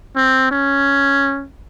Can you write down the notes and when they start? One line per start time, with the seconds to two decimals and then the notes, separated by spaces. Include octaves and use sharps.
0.16 C4
0.51 C#4